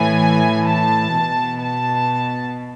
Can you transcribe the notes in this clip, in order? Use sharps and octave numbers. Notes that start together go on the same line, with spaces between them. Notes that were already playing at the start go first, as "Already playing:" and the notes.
Already playing: A2 E3 G#5
A5
B2
A5